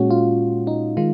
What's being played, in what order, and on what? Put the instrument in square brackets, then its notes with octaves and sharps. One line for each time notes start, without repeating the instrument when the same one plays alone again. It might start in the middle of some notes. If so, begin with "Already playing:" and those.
Already playing: [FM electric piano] A#2 G#3 C#4 F#4
F4
D#4
D#3 G#3 F4